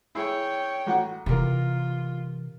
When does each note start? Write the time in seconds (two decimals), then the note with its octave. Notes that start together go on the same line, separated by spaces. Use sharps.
0.15 E4 G#4 C#5 E5 G5
0.87 A1 F#4 F#5
1.26 C3 E3 F4 G4 A#4